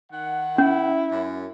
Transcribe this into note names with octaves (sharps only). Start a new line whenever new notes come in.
D#3 F#5
C#4 E4
F#2